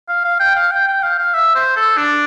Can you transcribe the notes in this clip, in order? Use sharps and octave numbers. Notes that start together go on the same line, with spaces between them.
F5
F5
G5
F5
G5
G5
F5
F5
E5
C5
A4
D4